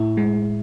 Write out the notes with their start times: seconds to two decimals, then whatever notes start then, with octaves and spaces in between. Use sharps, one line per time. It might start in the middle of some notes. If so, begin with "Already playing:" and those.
Already playing: A2 E4
0.17 G#3